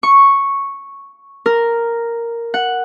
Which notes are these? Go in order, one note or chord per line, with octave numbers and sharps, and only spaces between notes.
C#6
A#4
F#5